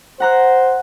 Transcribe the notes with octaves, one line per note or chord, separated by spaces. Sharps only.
C5 F#5 A#5 F#6